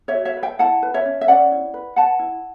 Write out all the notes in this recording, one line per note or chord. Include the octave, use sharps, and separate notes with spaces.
C#5 E5
F#4
C#5 E5
B4
E5 G5
E4 F#5 A5
B4
C#5 E5
C#4
E5
C#4 D5 F#5
E4
B4
B4 F#5 A5
E4